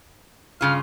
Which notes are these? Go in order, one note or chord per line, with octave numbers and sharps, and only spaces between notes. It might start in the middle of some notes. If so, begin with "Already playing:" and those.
G2 C#3 F4 F6